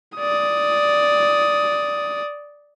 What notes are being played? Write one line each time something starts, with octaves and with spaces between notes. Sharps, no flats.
D5 D#6